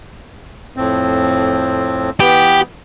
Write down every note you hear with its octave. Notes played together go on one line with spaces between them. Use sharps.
F2 A2 C4
E3 B3 G4 B5